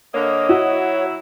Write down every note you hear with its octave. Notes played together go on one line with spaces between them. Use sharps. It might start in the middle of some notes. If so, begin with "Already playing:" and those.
D3 A#3 C#5 D#5
F#3 E4 F#4